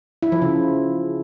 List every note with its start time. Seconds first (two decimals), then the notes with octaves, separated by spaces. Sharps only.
0.23 E4
0.32 F3
0.42 C#3